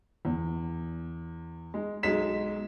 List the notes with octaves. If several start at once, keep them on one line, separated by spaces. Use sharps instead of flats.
E2
G#3
B1 F#3 G#3 B6 E7